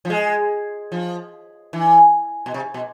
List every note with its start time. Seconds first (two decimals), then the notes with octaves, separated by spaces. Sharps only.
0.05 F3
0.10 G#3
0.92 F3
1.73 E3
2.46 B2
2.54 C3
2.74 B2